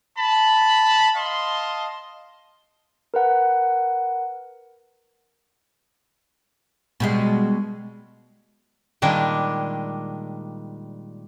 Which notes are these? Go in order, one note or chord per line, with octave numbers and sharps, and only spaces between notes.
A5 B5
D#5 F5 A5 C6
A#4 B4 F#5
B2 G3 G#3
A#2 D#3 G3 G#3 D4